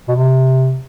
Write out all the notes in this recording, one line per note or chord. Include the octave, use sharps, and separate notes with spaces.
B2
C3